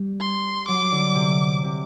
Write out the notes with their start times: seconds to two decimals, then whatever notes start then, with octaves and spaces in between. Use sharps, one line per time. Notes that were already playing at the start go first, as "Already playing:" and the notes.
Already playing: G3
0.20 C6
0.68 F#3 D6
0.92 D3
1.15 C3
1.64 C3